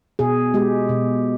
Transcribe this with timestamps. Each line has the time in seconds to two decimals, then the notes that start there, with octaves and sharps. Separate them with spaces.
0.19 B2 G#4
0.54 G#3 G4
0.89 B2